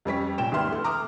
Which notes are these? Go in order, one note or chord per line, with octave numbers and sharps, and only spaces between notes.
F2 G3 C#4 B6
A#2 G5 E7
G#1 D#2 B3 E5 C6 F6
A3
A#5 D6 D#6 F6